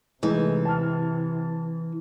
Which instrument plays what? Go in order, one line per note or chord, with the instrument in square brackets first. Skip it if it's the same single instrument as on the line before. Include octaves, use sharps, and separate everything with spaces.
[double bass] C3 [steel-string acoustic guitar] E3 [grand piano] G#3 A3 D#4
[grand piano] A5 F6